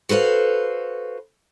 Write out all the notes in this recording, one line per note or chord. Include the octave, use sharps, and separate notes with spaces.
F#4 A4 B4 C5 F5